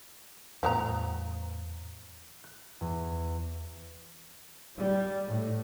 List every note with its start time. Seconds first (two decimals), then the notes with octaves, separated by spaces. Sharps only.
0.63 E2 A2 F3 B3 A#5
2.44 F#6
2.81 E2
4.78 G3
5.27 A2